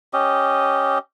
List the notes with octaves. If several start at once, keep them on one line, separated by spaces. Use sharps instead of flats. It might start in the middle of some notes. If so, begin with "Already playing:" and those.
C#4 G4 D#5